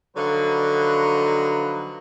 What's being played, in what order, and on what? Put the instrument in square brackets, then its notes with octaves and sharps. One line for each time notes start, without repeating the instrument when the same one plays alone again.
[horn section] D3 F3 F#3 D#4 B4